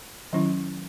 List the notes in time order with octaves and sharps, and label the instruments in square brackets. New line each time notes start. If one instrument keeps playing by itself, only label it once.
[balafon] D#3 F#3 C#4 E4